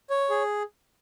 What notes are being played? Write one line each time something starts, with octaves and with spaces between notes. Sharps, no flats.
C#5
G#4